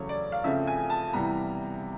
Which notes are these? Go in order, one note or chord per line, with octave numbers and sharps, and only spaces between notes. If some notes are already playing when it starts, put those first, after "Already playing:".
Already playing: E2 C#3 F#3 A3 C#5
D5
F5
C#3 F3 A3 C4 E5
G#5
A5
C3 E3 G3 B3 A#5